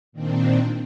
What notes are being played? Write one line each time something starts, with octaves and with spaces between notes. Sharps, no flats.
A#2 D#3 C4 D4